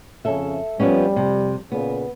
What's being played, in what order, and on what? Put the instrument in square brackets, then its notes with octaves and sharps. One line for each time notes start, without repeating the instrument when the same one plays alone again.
[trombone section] F2 C#3 C#4 [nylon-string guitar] A4 E5
[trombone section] F2 G3 [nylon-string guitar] F3 B3 C#4
[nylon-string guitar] C3
[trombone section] A#2 C#3 [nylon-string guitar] B3